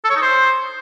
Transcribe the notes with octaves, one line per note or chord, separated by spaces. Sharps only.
A4
C#5
D#4
C5